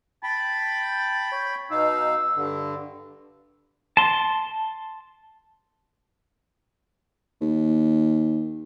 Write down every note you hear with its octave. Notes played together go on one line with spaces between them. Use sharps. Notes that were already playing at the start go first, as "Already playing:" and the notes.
G5 A5 B5
C#5
B2 D#4 F5 E6
G2 D3
A5 C6
D#2